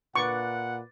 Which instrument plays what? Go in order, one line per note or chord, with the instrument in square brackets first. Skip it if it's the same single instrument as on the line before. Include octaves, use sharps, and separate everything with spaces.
[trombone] A#2 [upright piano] B4 D6 A6 [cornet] F#5 [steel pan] C#6